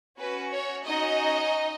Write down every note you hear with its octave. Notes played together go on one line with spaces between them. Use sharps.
C#4 F#4 B4
C#5
C#4 D#4 F#4 D#5